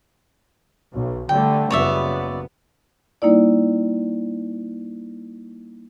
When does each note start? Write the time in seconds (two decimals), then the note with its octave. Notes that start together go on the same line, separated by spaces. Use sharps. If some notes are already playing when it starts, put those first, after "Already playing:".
0.93 B1
1.29 D3 G3 A3 G5
1.71 F#1 B3 C#5 D5 E5
3.22 G3 A#3 D#4 E4 D5